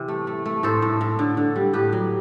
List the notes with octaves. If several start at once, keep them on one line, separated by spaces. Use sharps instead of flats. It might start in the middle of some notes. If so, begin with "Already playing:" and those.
Already playing: C3 E3
A3
A3
A3
A2 A4 C5
A2
A2
D3
D3
G3
A2 G4 B4
F#3